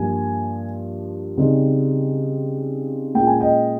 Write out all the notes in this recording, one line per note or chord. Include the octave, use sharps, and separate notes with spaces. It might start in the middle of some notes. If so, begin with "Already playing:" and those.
Already playing: G2 F3 A#3 G#5
C#3 G3 C4 D#4
A#2 G#3 C#4 F4 G5
G#5
D#5 G5